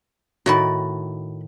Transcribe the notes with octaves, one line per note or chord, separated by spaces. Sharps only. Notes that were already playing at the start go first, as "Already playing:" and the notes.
A2 D#3 F#4 A5 B5